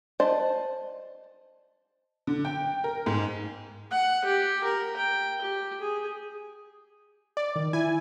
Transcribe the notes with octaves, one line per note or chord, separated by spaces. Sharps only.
C5 D5 D#5 A5
D3
G5
A#4
G#2
F#5
G4
A#4
G5
G4
G#4
D5
D#3
E4 G#5